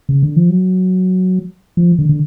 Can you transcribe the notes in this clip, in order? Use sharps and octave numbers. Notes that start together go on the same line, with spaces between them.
C#3
D3
F3
F#3
F3
D3
D3